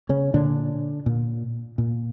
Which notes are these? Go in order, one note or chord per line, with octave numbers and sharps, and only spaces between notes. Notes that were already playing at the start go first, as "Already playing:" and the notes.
C#3 C#4
A#2 D3 D4
A#2
A#2